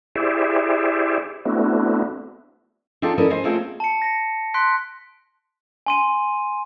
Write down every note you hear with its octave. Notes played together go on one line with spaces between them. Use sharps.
E4 G4 G#4 C5 D5 E5
A3 B3 C4 D4 E4 F#4
C4 D4 D#4 F4 G#4 A4
C#4 E4 A4 A#4 D5 D#5
G#4 C5 D#5
A3 A#3 C4 C#4 F4 G#4
A5 C#7
A#6 C#7
C6 F#6 B6 D7
G#5 C6 D#7